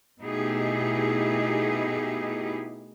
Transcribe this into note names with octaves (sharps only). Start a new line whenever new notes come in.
B2 A3 D#4 E4 G4 G#4